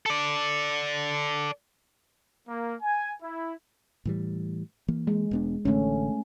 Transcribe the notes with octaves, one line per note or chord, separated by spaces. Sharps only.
A4 D5
A#3
G#5
E4
A2 E3 G3
E3 A#3
G#3
E1 B3 D4
A1 D3 A3 C#4